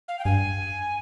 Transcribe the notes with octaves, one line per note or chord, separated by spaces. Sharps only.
F5
G5
G2 G#5